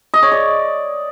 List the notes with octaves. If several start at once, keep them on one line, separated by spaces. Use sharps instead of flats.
D#5
C#5
D5